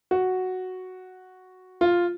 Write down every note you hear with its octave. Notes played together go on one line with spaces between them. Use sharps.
F#4
F4